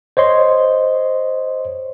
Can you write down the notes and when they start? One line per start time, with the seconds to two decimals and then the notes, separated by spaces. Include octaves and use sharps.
0.17 C5 C#5 D#5 C6